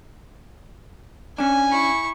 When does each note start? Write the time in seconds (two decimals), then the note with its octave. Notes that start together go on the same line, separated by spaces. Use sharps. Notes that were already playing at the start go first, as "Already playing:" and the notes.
1.38 C#4 D4 G#5
1.70 E4 C#6